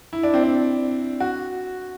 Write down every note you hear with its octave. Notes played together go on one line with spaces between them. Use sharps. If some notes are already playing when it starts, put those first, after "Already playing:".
E4
D4
C4
D4
F#4